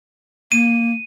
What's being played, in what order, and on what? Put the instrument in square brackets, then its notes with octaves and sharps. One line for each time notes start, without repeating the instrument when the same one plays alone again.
[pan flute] A#3 [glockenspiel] D#7